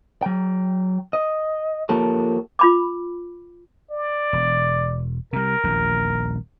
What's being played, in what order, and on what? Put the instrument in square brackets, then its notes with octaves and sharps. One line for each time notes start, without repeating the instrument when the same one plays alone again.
[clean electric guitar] F#3 G5
D#5
F3 A#3 G4 A4 C#5
[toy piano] F4 B5 D6
[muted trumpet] D5
[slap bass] E1
[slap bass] C3 G3 [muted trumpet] A#4
[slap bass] D#1 A#1 E2